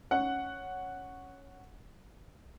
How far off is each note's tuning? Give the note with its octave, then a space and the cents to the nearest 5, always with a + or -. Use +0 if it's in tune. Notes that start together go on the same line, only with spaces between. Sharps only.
C#4 +0 F#5 +0